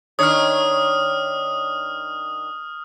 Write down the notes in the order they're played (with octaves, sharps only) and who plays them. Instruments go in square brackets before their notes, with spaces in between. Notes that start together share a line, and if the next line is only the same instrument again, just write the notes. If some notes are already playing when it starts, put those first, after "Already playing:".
[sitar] D#3 D4 C#5 [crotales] D#6 F6